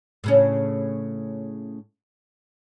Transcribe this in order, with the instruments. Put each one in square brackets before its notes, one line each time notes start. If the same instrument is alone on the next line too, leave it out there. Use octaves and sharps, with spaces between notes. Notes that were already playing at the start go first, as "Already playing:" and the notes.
[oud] A2 C#3 C#4